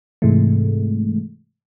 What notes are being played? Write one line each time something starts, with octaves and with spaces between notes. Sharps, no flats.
G#2 C3 E3 G#3 A3